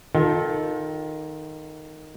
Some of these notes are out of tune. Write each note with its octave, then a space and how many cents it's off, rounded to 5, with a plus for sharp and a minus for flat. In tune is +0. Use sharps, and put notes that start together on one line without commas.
D#3 +0 F4 +25 A4 -10